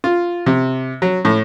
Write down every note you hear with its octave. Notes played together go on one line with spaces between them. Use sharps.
F4
C3
F#3
A2